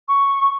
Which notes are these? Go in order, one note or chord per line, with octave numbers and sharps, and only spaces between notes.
C#6